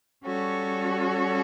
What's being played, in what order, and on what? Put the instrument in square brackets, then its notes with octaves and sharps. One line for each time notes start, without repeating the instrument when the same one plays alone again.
[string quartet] G3 C#4 F#4 A4 C#5